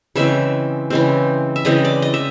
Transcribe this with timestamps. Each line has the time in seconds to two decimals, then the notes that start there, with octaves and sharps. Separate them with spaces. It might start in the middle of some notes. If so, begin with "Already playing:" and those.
0.15 C#3 E3 G#3 C4 E5
0.90 C#3 E3 G#3 C4
1.56 E5
1.65 C#3 E3 G#3 C4 D#5
1.85 D5
2.02 D#5
2.14 E5